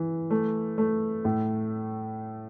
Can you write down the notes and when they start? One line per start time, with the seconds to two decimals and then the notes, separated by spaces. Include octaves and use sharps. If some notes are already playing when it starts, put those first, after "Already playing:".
Already playing: E3
0.31 A3
0.78 A3
1.25 A2